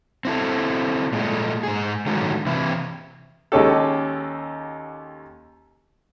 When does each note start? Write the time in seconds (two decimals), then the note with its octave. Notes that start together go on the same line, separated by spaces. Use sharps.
0.25 C4 E4 A4
1.13 A#2 G#3 A3
1.63 G#2 G#4
2.06 A2 D3 D#3 F#3 G#3
2.46 C3 E3 E4
3.52 D#2 G#3 C#4 G4 A4